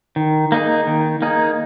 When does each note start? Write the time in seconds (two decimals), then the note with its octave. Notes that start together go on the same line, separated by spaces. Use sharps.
0.16 D#3
0.52 A#3 D#4 G#4
0.87 D#3
1.22 A#3 D#4 G#4